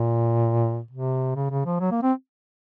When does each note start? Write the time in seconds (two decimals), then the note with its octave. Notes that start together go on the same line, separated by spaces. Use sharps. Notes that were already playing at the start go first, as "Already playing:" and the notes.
Already playing: A#2
0.91 C3
1.36 C#3
1.51 C#3
1.66 F3
1.80 F#3
1.91 A#3
2.02 C4